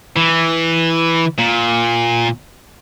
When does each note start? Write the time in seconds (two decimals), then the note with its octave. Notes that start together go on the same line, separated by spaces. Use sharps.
0.17 E3
1.38 A#2